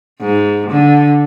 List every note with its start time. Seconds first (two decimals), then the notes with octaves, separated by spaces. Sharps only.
0.20 G#2
0.70 D3